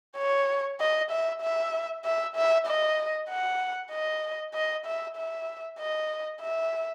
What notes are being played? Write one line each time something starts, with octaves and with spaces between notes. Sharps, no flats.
C#5
D#5
E5
E5
E5
E5
D#5
F#5
D#5
D#5
E5
E5
D#5
E5